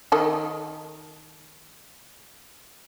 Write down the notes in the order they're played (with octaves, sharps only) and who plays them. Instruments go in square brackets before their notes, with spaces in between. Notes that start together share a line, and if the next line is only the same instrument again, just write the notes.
[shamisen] D#3 A4